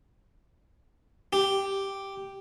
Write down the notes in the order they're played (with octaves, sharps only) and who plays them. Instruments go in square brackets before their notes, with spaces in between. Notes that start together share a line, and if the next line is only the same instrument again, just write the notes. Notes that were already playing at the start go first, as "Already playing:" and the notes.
[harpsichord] G4